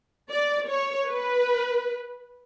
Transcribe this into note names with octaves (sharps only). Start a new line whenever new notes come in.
D5
C#5
B4